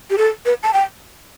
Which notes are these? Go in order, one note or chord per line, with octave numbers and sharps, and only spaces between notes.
G4
A4
B4
A5
G5